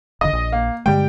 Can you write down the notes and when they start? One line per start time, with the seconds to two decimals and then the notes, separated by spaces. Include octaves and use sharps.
0.21 F1 A#2 D3 D#5
0.33 A#1
0.52 A#3
0.86 G2 D3 G3 G#3 G5